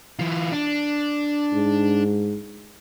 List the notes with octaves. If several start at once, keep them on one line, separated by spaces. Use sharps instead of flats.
E3 F4
D4
G#2